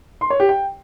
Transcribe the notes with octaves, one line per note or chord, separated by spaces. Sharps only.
C6
C#5
G4
G5